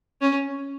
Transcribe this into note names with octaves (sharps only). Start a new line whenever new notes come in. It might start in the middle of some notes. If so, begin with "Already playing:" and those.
C#4